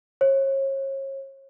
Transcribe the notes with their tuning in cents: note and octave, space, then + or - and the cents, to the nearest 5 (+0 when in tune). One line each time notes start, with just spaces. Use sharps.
C#5 -35